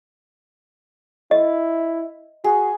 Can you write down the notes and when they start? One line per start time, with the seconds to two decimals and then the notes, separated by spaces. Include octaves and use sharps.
1.31 E4 D#5
2.44 F#4 G#4